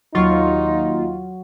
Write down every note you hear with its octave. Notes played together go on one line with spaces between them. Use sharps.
D#2 F#3 D#4 F4 C#6 F6